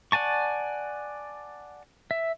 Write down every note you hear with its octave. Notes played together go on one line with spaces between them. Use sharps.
D5 F#5 G#5 A5 C#6
E5